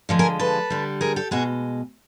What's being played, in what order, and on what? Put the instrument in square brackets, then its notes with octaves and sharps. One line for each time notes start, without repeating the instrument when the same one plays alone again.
[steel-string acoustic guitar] D3 F3 G#3
G#4 A#4
A4 B4
D3 G3
G#4 A#4
G4 A4
B2 G#3 F#4 G#4